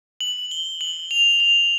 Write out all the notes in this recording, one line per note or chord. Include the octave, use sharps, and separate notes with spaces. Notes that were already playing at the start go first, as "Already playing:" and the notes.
F#7
G7
F#7
F7
F7